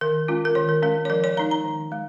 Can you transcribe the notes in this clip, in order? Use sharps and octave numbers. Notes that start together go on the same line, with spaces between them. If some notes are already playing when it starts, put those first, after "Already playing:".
D#3 A#4
G#3 C#4 F4
A#4
D#3 C#5
A#4
G#3 C#4 A#4
C#5
F3 A#4
C#5
G#3 D#4 A#5
A#5
D#3
G#3